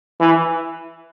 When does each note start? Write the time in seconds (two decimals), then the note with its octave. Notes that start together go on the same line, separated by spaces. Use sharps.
0.20 E3